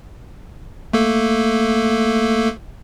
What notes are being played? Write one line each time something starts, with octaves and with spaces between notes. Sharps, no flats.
A3 A#3 A4